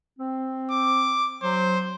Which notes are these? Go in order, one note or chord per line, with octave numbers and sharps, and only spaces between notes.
C4
D6
F#3 C5